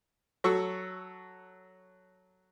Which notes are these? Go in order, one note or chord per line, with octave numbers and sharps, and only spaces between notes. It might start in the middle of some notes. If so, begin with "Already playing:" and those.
F#3 A4 C#6 E6